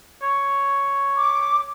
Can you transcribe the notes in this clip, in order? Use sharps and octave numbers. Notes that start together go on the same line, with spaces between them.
C#5
D6